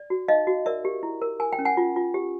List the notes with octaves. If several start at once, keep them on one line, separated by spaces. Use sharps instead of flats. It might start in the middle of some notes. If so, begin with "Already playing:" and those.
Already playing: D5
F#4
D#4 D#5 F5
F#4
A#4 D5 E5
G4
E4
A#4
A#4 G#5
G5
C#4
F#5 G#5
F4
F4
G4